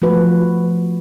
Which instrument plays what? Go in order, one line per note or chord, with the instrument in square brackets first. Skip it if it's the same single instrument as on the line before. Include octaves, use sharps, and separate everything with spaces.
[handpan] F3 A3 F#4 B4